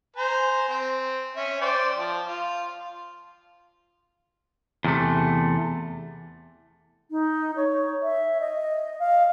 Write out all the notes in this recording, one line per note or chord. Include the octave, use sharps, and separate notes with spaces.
C5 G#5 A#5
C4
C#4 E5
C5 D5 G5
F3
F4
E2 C3 A3
D#4
C#5
E5
D#5
F5